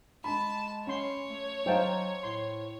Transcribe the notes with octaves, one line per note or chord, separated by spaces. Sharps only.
G#3 A5 B5
C#4 C#5 C6
A3
F#3 D#4 C5 F5 G5 A5
A2 C6